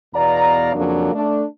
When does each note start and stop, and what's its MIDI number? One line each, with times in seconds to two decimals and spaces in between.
0.14 0.70 40
0.14 0.70 47
0.14 0.70 74
0.14 0.70 77
0.14 0.70 82
0.74 1.11 41
0.74 1.11 49
0.74 1.11 53
0.74 1.11 54
0.74 1.11 58
0.74 1.11 62
1.14 1.44 57
1.14 1.44 62